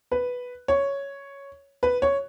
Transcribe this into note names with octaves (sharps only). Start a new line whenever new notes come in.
B4
C#5
B4
C#5